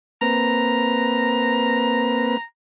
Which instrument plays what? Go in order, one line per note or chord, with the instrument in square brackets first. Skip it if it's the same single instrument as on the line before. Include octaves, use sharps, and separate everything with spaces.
[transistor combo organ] A#3 C4 B4 [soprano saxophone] A#5